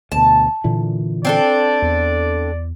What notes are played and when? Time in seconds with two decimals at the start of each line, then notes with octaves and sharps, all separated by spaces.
0.12 D2 B2 A5
0.64 A#2 D3 E3
1.25 C4 D4 A4 D5
1.82 E2